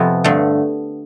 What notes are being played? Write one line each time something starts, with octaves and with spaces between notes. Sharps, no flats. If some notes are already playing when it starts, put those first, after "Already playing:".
Already playing: F2 C3 F3 B3
G2 D3 A3